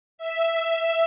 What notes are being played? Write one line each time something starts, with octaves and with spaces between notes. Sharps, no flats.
E5